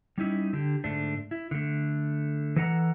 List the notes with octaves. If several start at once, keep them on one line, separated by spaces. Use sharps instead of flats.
G3 C#4 D#4 E4
D3 G4
G#2 D3 A3 D4
E4
D3 A3
E3 A4 D#5 F#5 A5 A#5